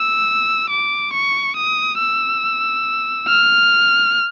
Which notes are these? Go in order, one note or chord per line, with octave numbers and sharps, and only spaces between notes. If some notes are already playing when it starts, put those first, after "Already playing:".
Already playing: E6
D6
C#6
D#6
E6
F6